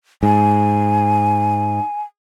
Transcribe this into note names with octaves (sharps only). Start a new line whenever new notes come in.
G#2 G#5